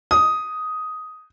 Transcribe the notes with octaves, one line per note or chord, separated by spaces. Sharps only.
D#6